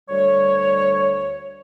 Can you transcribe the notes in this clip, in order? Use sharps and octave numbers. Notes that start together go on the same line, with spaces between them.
D2 G3 C#5